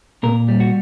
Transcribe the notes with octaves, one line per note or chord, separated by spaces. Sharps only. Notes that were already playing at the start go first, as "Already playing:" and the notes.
A#2 A#4
G3
F#4